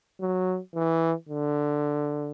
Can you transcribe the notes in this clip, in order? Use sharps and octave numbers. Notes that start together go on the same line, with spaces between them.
F#3
E3
D3